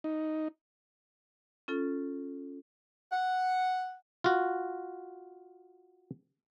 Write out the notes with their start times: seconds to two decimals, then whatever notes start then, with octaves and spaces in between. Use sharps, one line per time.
0.04 D#4
1.68 C#4 F4 A4
3.11 F#5
4.24 F4 F#4